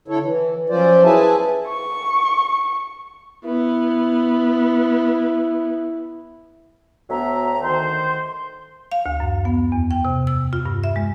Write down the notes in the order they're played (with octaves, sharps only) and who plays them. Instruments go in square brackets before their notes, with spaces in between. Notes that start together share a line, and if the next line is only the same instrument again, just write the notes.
[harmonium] D3 E4 A4 C#5
E3
F3 F#3 C#4 F4 C5 D5
E4 G#4 B4 E5 G#5 A5
[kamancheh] C#6
[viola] B3 [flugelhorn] E4
[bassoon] D2 [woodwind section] F#3 B3 E5 [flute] A#5
[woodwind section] D#3 C5 [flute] C6
[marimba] F5
D2
F#2
B3
E2
G5
C3
E6
F4
G2
E5
G#3